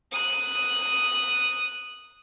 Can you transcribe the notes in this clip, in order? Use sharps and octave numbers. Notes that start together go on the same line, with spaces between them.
D#6 F#6